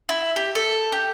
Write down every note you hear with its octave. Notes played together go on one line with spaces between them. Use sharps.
E4
G4
A4
G4